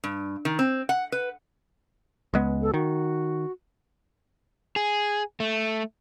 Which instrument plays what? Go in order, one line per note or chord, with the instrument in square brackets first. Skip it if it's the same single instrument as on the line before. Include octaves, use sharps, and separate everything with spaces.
[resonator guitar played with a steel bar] G2
D#3
C4
F#5
B4
[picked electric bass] C#2 G#3 B3
[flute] A4
[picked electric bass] D#3 [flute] F#4
[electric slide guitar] G#4
A3